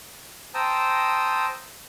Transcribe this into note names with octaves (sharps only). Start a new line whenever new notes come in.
C5 G5 A5 A#5 D#6 E6